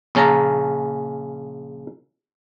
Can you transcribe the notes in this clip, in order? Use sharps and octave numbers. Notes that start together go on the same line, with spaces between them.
A#1 C#3 C#4 A5 A#5